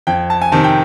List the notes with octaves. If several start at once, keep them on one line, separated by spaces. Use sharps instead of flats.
F2 G5
A5
G#5
C3 D#3 A5
G5